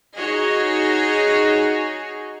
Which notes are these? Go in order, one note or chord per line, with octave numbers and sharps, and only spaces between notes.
D#4 F#4 G#4 C#5 D#5